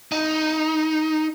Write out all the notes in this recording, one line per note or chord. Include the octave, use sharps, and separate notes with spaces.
D#4